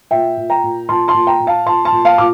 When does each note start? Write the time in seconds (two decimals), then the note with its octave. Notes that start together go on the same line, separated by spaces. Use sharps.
0.11 A#2 E5 G5
0.37 A#2
0.50 G5 A#5
0.64 A#2
0.89 A#2 A5 C6
1.08 A5 C6
1.14 A#2
1.27 G5 A#5
1.40 A#2
1.47 F5 A5
1.66 A#2 A5 C6
1.85 A5 C6
1.92 A#2
2.05 F5 A5
2.18 A#2 D6